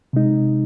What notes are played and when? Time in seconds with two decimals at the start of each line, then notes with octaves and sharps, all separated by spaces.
0.13 C3 G#3 D#4